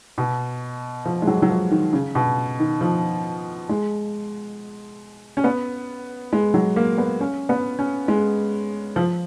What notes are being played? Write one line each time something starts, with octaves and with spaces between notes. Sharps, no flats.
B2
F3
G#3
F#3
F#3
F3
D#3
C#3
B2
D#3
F3
G#3
C#4
B3
G#3
F#3
A#3
B3
C#4
B3
C#4
G#3
F3